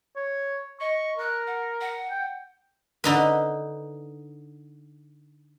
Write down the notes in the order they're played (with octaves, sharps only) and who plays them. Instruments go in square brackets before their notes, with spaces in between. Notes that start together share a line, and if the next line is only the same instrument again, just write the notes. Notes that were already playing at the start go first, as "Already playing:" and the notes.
[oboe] C#5
[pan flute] D#5 [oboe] C#6
[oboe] A#4 [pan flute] F#6
[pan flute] F#5
F#5
[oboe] G5
[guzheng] D3 D#4 B4